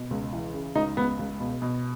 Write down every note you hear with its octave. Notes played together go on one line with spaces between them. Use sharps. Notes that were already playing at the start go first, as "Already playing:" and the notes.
Already playing: B2
C#2
E3
C#3
C#2 D#4
C#2 B3
C#2
B2
B2